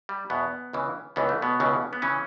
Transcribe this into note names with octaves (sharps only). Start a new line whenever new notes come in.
G3
E2 B2 B3
C#2 C#3 E3
C#2 C#3 E3 B3
A3
B2 B3
C#2 C#3 E3
B3
C#3 E3 C#4